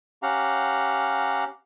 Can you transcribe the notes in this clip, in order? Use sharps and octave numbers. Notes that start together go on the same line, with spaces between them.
C#4 G4 F5 F#5 A#5